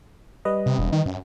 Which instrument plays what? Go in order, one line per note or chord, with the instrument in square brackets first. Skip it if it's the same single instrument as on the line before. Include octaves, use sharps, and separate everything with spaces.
[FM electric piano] G3 B4 D#5
[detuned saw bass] C3
E1
D#3
F#2